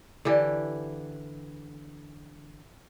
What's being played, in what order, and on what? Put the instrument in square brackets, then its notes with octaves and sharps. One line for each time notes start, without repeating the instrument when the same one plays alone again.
[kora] D3 E3 G4